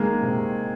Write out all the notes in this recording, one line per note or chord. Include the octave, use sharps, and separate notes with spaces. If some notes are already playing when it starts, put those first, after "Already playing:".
Already playing: D#3 G#3 A#3
C3